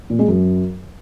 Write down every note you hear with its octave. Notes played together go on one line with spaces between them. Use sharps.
A#2
G#3
F#2